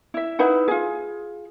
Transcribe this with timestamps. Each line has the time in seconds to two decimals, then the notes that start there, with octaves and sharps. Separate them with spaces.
0.14 E4 E5
0.39 D#4 E4 B4 F#5
0.68 F4 G#4